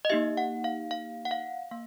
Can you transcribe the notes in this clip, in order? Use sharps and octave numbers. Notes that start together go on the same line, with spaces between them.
D#5
A#3 D#4 G4 E5
F#5
F5
F5
F#5
F5
A#3 F5